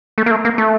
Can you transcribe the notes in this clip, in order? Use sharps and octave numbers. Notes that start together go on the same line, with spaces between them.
A3
A#3
A3
A#3
A3